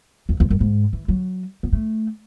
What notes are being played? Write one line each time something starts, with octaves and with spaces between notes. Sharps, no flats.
E2
E2
F#2
G#2
E3
F#3
B3
A3